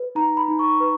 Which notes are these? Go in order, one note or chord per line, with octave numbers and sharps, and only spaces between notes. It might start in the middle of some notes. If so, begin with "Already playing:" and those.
Already playing: B4
D#4 A#5
B5
D#4
C#6
B4